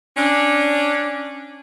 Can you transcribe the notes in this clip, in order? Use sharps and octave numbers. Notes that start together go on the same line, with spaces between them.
C#4 D4